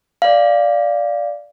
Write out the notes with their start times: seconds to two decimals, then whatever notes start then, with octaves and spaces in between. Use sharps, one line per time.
0.22 D5 F5